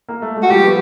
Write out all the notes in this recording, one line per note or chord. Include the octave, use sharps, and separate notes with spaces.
A#3
A3
G#3
F#4
F3 G3 G4
B3